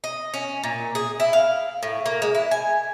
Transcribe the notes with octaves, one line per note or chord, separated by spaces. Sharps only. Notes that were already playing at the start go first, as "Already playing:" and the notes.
D#5
C#4
A#2
G#4
E4
F5
A2
A#3
G#3
E4
G#5